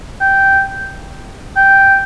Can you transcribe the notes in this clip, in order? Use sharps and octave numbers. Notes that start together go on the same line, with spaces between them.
G5
G5